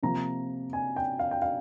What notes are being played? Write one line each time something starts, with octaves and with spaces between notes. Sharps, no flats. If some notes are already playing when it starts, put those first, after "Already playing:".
C3 F3 A#3 A#5
G#5
G5
F5
G5
F5